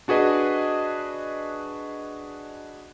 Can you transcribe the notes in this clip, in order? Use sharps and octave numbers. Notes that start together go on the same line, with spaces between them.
D4 F#4 G#4 B4 D#5